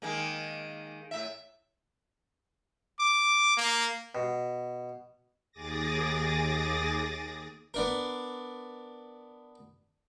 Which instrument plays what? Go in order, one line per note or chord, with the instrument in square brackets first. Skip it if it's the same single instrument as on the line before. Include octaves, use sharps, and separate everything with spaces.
[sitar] D#3 G#3 A#3
A2 E5
[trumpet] D6
A#3
[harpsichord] B2
[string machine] D#2 G#4 D6 D#6 A6 A#6
[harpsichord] B3 D4 A#4